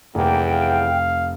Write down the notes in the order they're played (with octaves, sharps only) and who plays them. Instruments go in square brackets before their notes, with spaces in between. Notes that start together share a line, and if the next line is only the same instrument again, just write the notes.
[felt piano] F1 [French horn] E2 [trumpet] A#3 [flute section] G5
[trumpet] F5